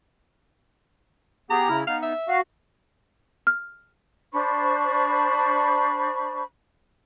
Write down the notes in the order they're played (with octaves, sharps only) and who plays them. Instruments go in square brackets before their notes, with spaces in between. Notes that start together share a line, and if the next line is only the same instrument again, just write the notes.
[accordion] B3 G4 G#4 [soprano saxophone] A#5
[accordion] C#3 E4 F6
[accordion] B3 D#4 [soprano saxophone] F5
[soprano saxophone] E5
[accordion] F#4 F5
[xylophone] F6
[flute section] D4 C5 B5 C#6